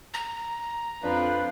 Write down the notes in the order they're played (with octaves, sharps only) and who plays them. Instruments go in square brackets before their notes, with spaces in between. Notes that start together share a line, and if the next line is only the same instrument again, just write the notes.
[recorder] A#5
[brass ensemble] F2 [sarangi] F3 [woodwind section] D4 B4